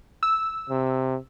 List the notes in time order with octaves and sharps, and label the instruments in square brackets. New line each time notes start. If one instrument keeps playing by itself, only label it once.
[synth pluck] E6
[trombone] C3